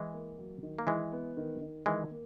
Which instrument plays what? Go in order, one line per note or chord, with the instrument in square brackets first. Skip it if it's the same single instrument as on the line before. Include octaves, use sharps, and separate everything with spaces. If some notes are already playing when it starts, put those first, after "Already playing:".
Already playing: [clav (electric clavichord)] E3 G#3 [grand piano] E4
[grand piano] A#3
F#3
D#3
[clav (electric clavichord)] A#3
[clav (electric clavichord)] E3 G#3 [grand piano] E4
[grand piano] B3
D#3
D#3
[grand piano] D#3 [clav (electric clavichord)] E3 G#3
[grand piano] A#3